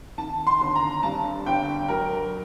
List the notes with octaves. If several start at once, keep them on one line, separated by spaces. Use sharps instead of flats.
D#3 A5
C6
G1
A#5
G2 A5
G1 G5
F#3 A#4